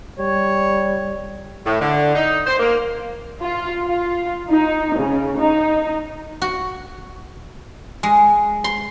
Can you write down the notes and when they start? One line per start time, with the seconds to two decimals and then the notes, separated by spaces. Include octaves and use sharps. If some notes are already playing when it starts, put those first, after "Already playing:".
0.19 G3 C#5
1.66 A2
1.81 D3
2.15 D#4
2.47 C5
2.59 A#3
3.42 F4
3.86 F4
4.50 D#4
4.99 C#3
5.39 D#4
6.42 F#4
8.03 G#3
8.64 C6